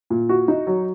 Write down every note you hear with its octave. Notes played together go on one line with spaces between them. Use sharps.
A#2
F#4
D#4
F#3